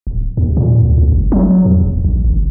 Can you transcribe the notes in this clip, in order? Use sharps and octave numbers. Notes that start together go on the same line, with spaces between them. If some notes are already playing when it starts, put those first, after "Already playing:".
D1
D#2
A#2
D2
D2
G1
F#3
E2
D#1
A#1
G1